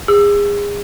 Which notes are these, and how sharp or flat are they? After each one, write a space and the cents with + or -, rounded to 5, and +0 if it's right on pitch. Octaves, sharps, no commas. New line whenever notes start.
G#4 -30 E6 +20